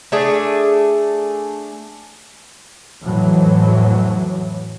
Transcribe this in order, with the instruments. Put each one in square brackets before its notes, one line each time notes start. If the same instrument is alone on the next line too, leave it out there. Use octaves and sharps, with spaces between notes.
[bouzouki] A3 D4 G#4
[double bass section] F2 A2 E3 F#3